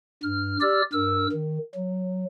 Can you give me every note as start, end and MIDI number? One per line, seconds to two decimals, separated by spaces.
0.23 0.57 43
0.23 0.57 89
0.61 0.82 67
0.61 0.82 74
0.61 0.82 88
0.61 0.82 89
0.93 1.27 43
0.93 1.27 70
0.93 1.27 88
1.33 1.58 51
1.75 2.25 54